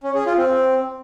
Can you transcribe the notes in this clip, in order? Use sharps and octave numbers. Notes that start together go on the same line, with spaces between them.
C#4
G#4
F4
C4